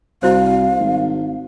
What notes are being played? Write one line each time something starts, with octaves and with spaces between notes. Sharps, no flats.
C2 E4 F#4 C5 F5
G#1